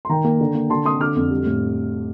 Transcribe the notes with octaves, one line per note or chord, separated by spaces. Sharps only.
C6
D#3 G5 A#5
A#3
D3
A#3
D3 A5 C6
C4 C6 D#6
D3 D6 F6
F2
G3
A2